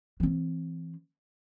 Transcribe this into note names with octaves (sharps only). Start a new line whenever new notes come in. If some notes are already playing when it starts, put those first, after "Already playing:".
E3 C4